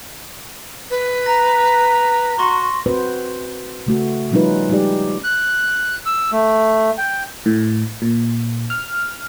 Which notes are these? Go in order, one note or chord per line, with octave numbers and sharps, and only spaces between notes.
B4
A#5 A#6
F#4 C6 C#6 A#6
C4 F#4 B4 C5
C#3 A3 F#4
F3 G3 C#4 D#4 F4 B4
G3 G#3 D#4 G4 D5
F#6
E6
A3
G5
A2
A#2
F6